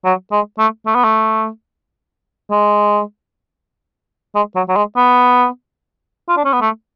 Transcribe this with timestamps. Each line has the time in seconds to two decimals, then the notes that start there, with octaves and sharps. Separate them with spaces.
0.05 F#3
0.32 G#3
0.59 A3
0.86 A3
0.95 B3
1.04 A3
2.51 G#3
4.36 G#3
4.56 F#3
4.69 F#3
4.77 G#3
4.97 B3
6.29 F4
6.37 D4
6.45 C#4
6.53 B3
6.61 A3